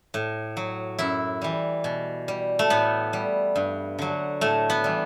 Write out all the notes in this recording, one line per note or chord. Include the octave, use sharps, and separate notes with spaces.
A2
F#3
F#2 E4
E3 G3
B2
G3
A3
A2 B3
G3
G2
D3 F#3
A2 A3
B3
E3 G3